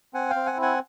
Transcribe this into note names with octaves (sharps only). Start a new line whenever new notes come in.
C4 F#5 G#5
F5 G5
C4
F#5 G#5
E4
F#5 G#5